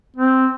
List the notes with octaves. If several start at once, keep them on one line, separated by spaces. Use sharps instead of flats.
C4